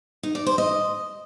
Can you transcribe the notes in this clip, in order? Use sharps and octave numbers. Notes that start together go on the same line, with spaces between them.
D#4
D5
C5
D#5